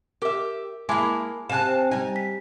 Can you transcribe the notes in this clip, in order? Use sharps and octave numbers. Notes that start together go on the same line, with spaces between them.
G4 A#4 E5 D6
G#3 A#3 E4 G#5 A5 D6
C3 F5 G#5 A5 F#6 E7
G3 D#4 G#5
B6